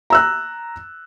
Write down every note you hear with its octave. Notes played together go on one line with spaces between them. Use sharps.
A#5 E6 F#6